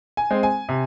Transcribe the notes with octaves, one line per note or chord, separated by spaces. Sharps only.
G#5
G#3 C4
G#5
C3